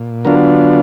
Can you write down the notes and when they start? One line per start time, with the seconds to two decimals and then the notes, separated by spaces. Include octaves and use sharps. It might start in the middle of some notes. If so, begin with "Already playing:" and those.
Already playing: A#2
0.25 D3 F#3 B3 D4 F4 A#4